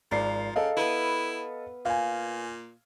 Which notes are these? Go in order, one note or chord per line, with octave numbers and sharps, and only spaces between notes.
G#1 F3 A#4 D5 C7
C#3 A4 D#5 F5
B3 E4 B4
A#2 F5 G#5